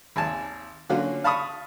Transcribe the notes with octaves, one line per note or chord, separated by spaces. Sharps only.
G#1 D#2 G#5 A5
D3 F#3 A#3 C#4 F4 F#4
F5 A5 B5 C#6 D#6